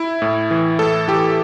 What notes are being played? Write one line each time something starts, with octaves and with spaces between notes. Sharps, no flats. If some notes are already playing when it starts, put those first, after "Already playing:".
Already playing: E4
A2
E3
A2 A4
E3 G4